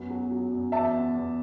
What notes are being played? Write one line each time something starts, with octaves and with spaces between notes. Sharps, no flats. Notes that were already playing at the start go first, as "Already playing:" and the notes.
Already playing: F#2 B3
F#3
F#3
F#2
E2 E5 A5
B3
E2